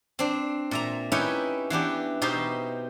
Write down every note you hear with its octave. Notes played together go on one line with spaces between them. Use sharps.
C4 D4
A#2 E5 A#5
C#4 D#4 E4 G4 B4 C#5
E3 B3 D4 G4
B2 D#4 G4 C5 E5